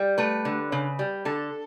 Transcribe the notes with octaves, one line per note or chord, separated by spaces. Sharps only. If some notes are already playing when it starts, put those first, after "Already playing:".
Already playing: G3
A3 B4
D3
C#3
G3
D3 A4